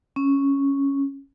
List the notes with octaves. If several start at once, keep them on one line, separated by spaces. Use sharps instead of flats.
C#4